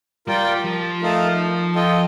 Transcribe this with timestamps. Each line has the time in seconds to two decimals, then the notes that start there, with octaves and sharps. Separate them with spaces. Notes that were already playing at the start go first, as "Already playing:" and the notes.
0.27 G3 F4 A#4 D5 G5
0.65 F3
1.02 A3 D#4 A#4 F5 A5
1.75 F4 A4 D#5 G5